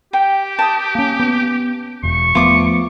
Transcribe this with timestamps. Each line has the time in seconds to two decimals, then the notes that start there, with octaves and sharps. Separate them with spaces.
0.13 G4 G5
0.59 A5 D#6
0.95 A#3 C#4
1.20 B3
2.03 E1 C#6
2.35 F3 A3 B3 F4 D6 D#6